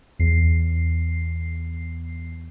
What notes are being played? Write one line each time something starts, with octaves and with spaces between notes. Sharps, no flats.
E2 C7